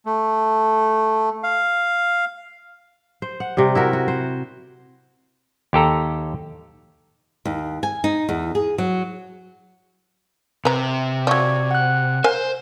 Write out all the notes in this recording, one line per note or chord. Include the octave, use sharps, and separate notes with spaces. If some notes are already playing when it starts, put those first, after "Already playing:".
A3
F5
C5
F#5
C3 G3
E4 F#4 A#4
F#4
C5
D#2 G4 A4 A#5
D#2
G#5
D#4
E2
G#4
F#3
C3 B4 A#5
F3 F#3 D5 C#6 G#6
F#5 F#6
A#4 C5 F5 G#5